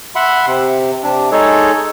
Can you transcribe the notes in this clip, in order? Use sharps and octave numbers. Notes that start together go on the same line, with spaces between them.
E5 F#5 B5 C6
C3
C3 D4
G#3 D#4 G#4 A4 C#5